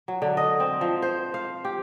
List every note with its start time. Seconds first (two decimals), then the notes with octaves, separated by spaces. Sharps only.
0.08 F#3
0.22 D3
0.37 D#5
0.60 C4
0.81 F3
1.02 C5
1.34 F5
1.65 G4